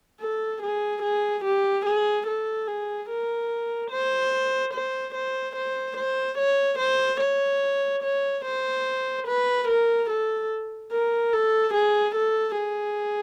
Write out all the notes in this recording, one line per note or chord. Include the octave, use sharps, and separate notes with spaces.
A4
G#4
G#4
G4
G#4
A4
G#4
A#4
C5
C5
C5
C5
C5
C#5
C5
C#5
C#5
C5
B4
A#4
A4
A#4
A4
G#4
A4
G#4